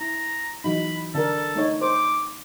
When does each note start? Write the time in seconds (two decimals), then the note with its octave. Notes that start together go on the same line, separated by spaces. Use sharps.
0.01 E4 A#5
0.64 E3 F#3 D#4 B5
1.15 D3 D4 A4 A#4
1.55 A3 D#4 C#5
1.81 C5 D6